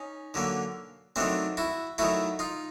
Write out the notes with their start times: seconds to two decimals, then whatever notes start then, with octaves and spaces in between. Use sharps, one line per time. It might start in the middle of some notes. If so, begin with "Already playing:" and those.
Already playing: C#4 D#4
0.34 D3 F#3 A#3
1.16 D#3 F#3 A3 C4 D4
1.57 E4 F#4
1.98 D#3 F#3 A3 E4 F#4
2.39 D#4 F4